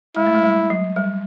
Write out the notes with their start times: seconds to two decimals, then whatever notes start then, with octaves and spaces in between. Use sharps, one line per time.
0.16 G#3 E4
0.27 A3
0.35 G#3
0.43 G3
0.70 F#3
0.96 G3